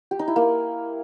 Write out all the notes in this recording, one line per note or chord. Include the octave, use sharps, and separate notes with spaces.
G4
D#4
E4
A#3